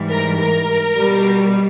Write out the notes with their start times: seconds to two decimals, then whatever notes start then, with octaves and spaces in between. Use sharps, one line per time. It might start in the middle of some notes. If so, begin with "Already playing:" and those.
Already playing: G#2 E3 G3
0.11 A#4
0.40 A#4
0.96 B2 G3